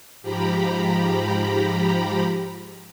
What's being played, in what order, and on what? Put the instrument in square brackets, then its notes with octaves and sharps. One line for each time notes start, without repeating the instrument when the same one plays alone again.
[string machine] G#2 F3 G4 A#5 B5